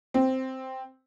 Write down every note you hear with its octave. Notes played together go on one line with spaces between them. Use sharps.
C4